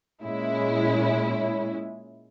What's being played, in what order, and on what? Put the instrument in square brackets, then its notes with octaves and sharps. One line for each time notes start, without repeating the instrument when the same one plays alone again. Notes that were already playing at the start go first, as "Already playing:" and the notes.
[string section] A#2 G#3 C#4 E4